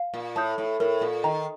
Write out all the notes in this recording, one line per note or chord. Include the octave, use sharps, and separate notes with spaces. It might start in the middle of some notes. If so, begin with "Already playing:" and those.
Already playing: F5
A#2
A2 A5 D#6 G6
A2
A2 A#4
A#2
D#3 D#5 G5 A#5